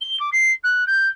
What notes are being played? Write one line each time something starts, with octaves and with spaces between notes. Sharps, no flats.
G7
D6
C7
F#6
G6